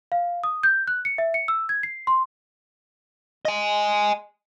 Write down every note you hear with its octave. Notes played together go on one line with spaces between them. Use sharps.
F5
D#6
G6
F#6
C#7
E5
C#7
E6
G#6
C7
C6
D#5 G#5